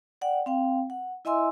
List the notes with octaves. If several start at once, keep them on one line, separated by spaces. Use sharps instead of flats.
D5 F#5 G5
C4 F5 G5
F#5
E4 D#5 E5 G#5 C6 E6